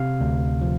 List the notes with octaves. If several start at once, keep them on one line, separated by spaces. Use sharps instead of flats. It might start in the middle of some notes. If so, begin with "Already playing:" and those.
Already playing: C3 F5
D2
F3